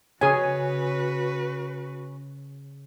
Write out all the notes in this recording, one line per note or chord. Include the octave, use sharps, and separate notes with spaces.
C#3 C#4 F#4 G#4 B4 G#5